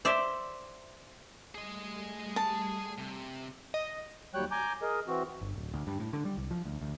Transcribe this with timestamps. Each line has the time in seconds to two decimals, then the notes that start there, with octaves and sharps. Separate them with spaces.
0.05 C5 D5 E5
1.55 G3 A3 G#4 D#5
2.36 A5
2.98 C3
3.74 D#5
4.34 D#2 F#3 G3 C#5 G5 F#6
4.51 G#5 A#5 D6 G6
4.82 G#4 A#4 D#5
5.08 E3 C4 F#4
5.41 G1
5.56 D1
5.74 D2
5.87 G2
6.00 A2
6.13 D3
6.25 G3
6.37 C2
6.51 F3
6.65 D2
6.81 D2